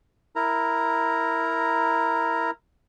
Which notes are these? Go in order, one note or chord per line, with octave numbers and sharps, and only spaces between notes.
E4 A#4 A#5